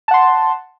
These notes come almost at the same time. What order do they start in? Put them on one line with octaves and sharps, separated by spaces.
A5 F#5 C6